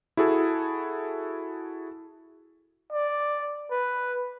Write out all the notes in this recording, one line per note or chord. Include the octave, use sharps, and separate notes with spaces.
E4 F#4 G#4 A4
D5
B4